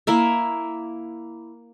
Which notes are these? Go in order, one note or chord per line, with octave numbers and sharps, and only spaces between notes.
A#3 E4 A#4 E5